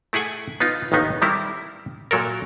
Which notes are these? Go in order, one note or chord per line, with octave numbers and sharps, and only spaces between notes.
A3 E4 G#4 F#5 G#5
B3 D#4 F4
A1 D#2 D#3 B3 D#4
D#3 G3 C4 E4
A#2 F#3 A4 A#4